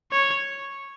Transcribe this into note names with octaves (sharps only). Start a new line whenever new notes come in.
C#5